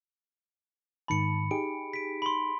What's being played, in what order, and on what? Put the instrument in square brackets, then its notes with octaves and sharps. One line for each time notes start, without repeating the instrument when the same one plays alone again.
[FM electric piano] G#2 D#3 A5 [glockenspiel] B5 C#7
[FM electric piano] D#4 G4 G#4 [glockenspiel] D7
[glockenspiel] B6 D7
B5 C6